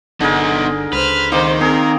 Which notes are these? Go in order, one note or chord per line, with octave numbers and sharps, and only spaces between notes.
G1 D3 B3 D#4 G#4 A#4
C#2 B4 C5 F6
D#3 A#3 C4 D#4 C5
C4 G#4 A#4